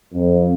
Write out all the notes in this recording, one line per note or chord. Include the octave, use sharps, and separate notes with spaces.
F2